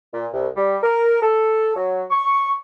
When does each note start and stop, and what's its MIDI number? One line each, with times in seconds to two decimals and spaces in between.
0.12 0.26 46
0.33 0.47 36
0.56 0.76 55
0.83 1.18 70
1.21 1.72 69
1.75 2.03 54
2.10 2.55 85